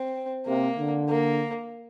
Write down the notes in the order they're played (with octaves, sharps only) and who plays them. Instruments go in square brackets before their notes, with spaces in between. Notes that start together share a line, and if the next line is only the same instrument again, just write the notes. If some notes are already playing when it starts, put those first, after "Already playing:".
Already playing: [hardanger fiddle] C4
[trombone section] C3 [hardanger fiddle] A#3
[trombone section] D3
[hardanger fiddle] A#3